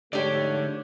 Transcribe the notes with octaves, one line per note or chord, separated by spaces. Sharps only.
G#2 D3 F3 A3 G4 C#5 D5